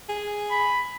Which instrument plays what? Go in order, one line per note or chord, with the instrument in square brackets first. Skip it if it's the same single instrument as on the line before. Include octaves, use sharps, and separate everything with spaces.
[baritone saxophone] G#4
[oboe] B5